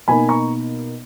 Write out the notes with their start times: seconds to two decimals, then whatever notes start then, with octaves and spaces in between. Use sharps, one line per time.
0.08 B2 A#3 D#4 G#5 B5
0.28 A#5 C#6